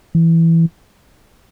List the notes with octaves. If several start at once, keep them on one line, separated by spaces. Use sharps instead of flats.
E3